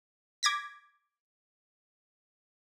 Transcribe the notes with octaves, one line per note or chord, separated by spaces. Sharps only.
D6 G#6 A#6 B6